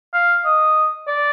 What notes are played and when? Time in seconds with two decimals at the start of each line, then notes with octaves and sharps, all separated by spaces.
0.13 F5
0.45 D#5
1.08 D5